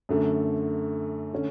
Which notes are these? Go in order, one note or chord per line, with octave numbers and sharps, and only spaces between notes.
F#2 D3 A3
D3 A3 C#4